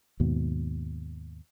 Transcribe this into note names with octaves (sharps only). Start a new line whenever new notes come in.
D#2 G#2 B2